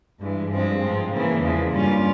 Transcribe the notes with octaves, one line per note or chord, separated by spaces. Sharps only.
G2 E3 G#3
G2 F3 G#3 C4
G#2 F3 G#3
C#3 E3 A#3
E2 C#3 F3 G#3
G2 G3 A#3 C#4 F4